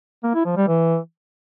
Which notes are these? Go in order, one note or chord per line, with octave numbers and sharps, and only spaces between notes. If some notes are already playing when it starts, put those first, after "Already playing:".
A#3
E4
F3
G3
E3